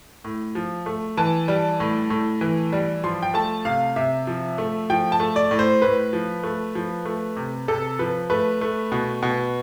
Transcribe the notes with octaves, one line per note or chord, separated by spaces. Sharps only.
A2
F3
A3
E3 A5
G3
A2
A2
E3
G3
F3 C6
G5
A3 A5
C3 F5
C3 E5
F3
A3
F3 G5
A5
A3
D5
A2
C5
A2 B4
F3
A3
F3
A3
C3
C3 A4
F3 B4
A3 B4
A3
B2
B2